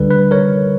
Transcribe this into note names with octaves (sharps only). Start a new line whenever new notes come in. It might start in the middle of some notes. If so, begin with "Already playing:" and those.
Already playing: D2 D3 G3 B4
B4
A#4 C#5